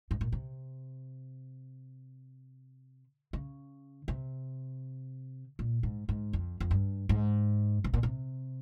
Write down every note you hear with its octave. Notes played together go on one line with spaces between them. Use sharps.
G#2
A#2
C3
C#3
C3
A#2
G#2
G#2
F2
F2
G2
G#2
C3
A#2
C3